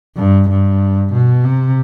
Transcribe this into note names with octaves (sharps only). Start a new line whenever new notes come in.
G2
G2
B2
C3